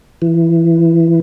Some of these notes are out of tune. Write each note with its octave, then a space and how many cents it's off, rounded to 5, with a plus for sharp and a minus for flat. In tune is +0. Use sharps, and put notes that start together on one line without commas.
E3 +15